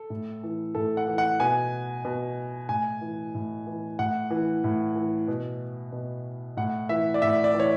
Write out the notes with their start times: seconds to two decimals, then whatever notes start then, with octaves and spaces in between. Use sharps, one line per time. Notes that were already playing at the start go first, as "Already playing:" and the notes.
Already playing: A4
0.10 A2
0.43 E3
0.75 A2 A4
0.97 F#5
1.08 E3
1.18 F#5
1.40 B2 G#5
2.05 B2
2.69 A2 G#5
3.01 E3
3.35 A2
3.67 E3
3.99 A2 F#5
4.31 E3
4.64 A2
4.96 E3
5.28 B2
5.92 B2
6.57 A2 F#5
6.89 E3 E5
7.14 D5
7.22 A2 E5
7.44 D5
7.55 E3 C#5